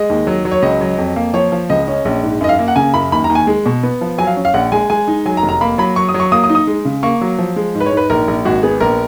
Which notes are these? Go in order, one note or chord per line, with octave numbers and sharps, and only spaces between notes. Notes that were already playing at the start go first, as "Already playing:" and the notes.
Already playing: G#3 D#5
D#2
F#3
F#3
C#5
C#2 D#5
F#3
F2
A#3
F3 C#5
F3
C#2 D#5
C#4
A#1
G#2
F#2 D#5
F5
A#3
F#5
C#3 G#5
F#2 B5
D#2 B5
A#5
D#2
G#5
G#3
B2
B3
F3
F#3 G#5
F5
C#4
F5
A#1 F#5
G#3 G#5
G#3 G#5
D#4
F#3 G#5
A#5
F1
A#5
A#3 B5
F#3 B5
F#3 C#6
D#6
F#3
C#6
A#3 D#6
D#6
D#4
D#6
G#3
C#3
A#3 C#6
F#3
F3
G#3
G#2
B4
C#5
G#2
B4
A#1 A#4
A#1
G#1 F#4
B3 G#4
A#1 A#4